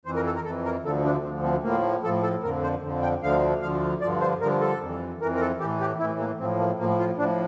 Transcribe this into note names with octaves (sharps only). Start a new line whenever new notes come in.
F2 E3 C5
A#4
A4
A#4
F2 E3 A4
A#4
D2 D3 F3 A4
D4
D2 D3 F3 C4
C4
A2 F3 A#3
A2 F3 A4
A4
F2 D3 F3 A#4
C5
F2 D3 F3
G5
D2 D3 F3 F5
D2 D3 F3 F5
G2 D3 F3 D5
C5
G2 D3 F3 A#4
A4
F2 E3
F2 E3 A#4
A#4
A4
A2 E3 G4
G4
A2 E3 E4
A#3
A2 F3 C4
A#3
A2 F3 A#3
F4
A2 F3 D4